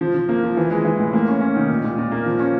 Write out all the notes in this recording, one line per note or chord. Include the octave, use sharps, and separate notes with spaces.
F3
F3
A#3
F3
E3
G#3
E3
A2
A#3
C#4
C#4
D#3
A#2
A#2
A#2
A#3
F3
C#4